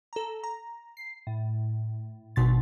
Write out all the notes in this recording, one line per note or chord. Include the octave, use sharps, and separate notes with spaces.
A4 A#5
A#5
C7
A2
G#1 B2 C6 A6